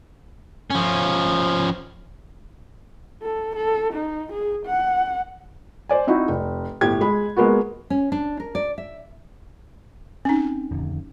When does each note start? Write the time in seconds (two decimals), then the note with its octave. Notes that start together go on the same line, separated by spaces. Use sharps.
0.70 F3 C#4
3.22 A4
3.56 A4
3.93 D#4
4.32 G#4
4.66 F#5
5.89 C5 D5 G#5
6.07 C4 D#4 E4 F#4
6.28 F1
6.81 G1 A2 G4 G#6
7.01 G#3 B5
7.36 G#3 A#3 B3 F#4
7.90 C#4
8.12 D4
8.40 A#4
8.55 D5
8.78 E5
10.25 C4 C#4 D#4
10.71 D#1 F2 D3